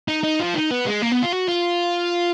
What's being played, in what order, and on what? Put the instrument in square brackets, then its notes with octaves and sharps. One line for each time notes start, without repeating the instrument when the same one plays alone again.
[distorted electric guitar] D#4
D#4
F3
D#4
B3
G#3
A#3
B3
F4
F#4
F4